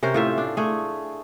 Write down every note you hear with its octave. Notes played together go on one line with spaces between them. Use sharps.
C3 C#4 A#4 C5
A2 F4 E5
D4
A3 G#4